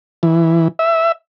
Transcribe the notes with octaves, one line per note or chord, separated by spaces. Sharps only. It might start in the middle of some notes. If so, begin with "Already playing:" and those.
E3
E5